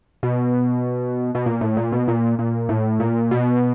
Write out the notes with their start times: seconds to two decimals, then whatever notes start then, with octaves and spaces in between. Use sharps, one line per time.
0.23 B2
1.35 B2
1.46 A#2
1.61 A2
1.77 A#2
1.92 B2
2.08 A#2
2.39 A#2
2.69 A2
3.00 A#2
3.31 B2